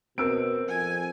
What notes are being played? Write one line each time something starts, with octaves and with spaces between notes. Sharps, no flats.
B2 C4 A#4 E6 D7
F2 G#5